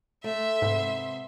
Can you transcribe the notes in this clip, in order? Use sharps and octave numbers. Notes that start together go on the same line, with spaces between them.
A3 E5 C6
G#2 C3 B3